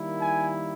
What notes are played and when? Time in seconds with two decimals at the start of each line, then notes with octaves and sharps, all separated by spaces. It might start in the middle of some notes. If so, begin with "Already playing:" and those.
Already playing: D#3 G3 A#3 E4
0.20 G#5